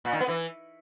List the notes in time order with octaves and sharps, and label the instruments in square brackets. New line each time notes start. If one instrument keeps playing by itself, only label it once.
[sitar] A#2
D#3
B3
E3